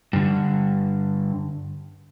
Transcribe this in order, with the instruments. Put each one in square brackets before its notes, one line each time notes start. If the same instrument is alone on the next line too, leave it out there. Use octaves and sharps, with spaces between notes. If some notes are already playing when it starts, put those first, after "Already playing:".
[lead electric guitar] G2 D3